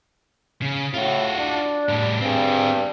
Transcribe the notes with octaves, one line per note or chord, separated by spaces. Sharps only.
C#3
A2 F4 F#4
D4
A2 G3
G2 C4 G#4